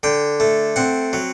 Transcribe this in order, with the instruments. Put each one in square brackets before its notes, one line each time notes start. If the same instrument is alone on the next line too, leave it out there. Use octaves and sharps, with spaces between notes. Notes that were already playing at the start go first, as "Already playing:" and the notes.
[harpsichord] D3 G5
A3
C4 F#5
F#3